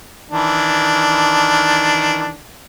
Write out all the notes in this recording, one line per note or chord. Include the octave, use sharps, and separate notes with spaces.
D#3 E3 D4